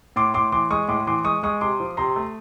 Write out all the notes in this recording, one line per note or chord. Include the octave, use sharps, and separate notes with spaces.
A2 C6 D6
A2 C6 D6
E3 C6 D6
G#3 C#6 D#6
A2 C6 D6
E3 C6 D6
G#3 C#6 D#6
G#3 C#6 D#6
C3 C6 D6
F3
C3 A#5 C6
A3